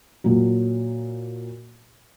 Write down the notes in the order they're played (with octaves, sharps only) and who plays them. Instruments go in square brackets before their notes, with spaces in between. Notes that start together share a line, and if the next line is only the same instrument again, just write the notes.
[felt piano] A#2 F#3